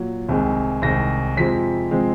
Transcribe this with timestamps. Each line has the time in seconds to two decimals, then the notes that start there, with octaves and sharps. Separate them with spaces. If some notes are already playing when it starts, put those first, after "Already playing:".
Already playing: A#2 F#3
0.29 C2 C3 D#3 G#3
0.82 C2 C3 D#3 G#3 A#6
1.37 F2 C3 F3 G#3 C4 B6
1.91 C3 F3 G#3 C4